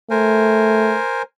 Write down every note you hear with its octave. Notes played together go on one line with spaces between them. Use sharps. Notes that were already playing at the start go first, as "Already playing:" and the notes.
A3 A#4 C5 G#5